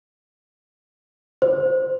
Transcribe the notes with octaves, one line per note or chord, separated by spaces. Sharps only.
C5